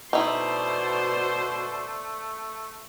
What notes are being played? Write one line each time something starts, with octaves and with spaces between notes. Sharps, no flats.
B2 A3 D#4 E4 C5 D5